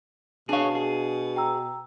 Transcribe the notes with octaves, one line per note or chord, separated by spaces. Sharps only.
B2 D4 G#4 C#5 F5
G#4
G5 A#5 E6